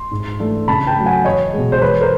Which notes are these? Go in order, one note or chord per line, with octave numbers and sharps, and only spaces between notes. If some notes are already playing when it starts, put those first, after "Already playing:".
Already playing: C6
G#2
E3 A3 D4
C#3 A5 B5
G5 A5
F#3 A3
F#5 G#5
E2 C#5 D#5
B2 G#3
C5
E2 B4 C#5
A#4 C5